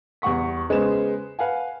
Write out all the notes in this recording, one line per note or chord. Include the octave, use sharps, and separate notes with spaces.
E2 G3 F#5 C#6 B6
C#3 G#3 B3 C5 E7
B4 F5 F#5 G#5